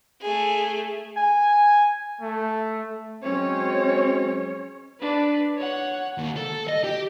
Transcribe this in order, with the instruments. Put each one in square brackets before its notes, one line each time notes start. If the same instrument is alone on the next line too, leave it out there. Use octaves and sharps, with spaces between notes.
[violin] A3 G#4
[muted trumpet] G#5
A3
[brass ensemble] F#3 G#3 C4 [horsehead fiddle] C#4 C#5
[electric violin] D4 B4
C#5 F#5
[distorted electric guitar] D#2
A4
D#5
G4